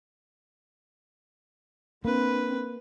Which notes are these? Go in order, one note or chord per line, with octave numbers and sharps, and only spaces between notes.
A#3 C4 D4 B4